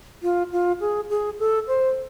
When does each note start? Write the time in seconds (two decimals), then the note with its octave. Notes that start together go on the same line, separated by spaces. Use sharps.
0.23 F4
0.52 F4
0.80 G#4
1.10 G#4
1.39 A4
1.67 C5